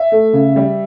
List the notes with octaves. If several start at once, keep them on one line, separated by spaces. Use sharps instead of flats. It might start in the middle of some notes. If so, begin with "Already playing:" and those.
Already playing: E5
A3
C#3
G3